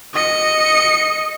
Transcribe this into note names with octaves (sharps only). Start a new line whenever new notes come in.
D#5 C#7